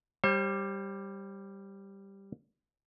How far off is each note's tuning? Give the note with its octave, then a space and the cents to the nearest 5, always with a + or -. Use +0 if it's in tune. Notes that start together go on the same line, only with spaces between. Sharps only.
G3 +0 C5 +40